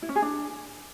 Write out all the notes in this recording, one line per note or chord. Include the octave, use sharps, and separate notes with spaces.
E4
C#4
G#4
D4